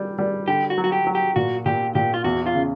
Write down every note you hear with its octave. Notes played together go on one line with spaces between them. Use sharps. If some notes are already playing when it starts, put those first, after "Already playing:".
Already playing: G3
G3
D3 G4
F#4
F#3
F#4
G4
F#3
G4
A#2 F#4
A#2 G4
A#2 G4
F4
E2 F#4
F4
C#3